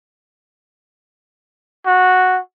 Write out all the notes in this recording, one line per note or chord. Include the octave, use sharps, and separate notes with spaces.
F#4